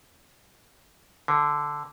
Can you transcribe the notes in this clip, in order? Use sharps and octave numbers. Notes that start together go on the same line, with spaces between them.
D3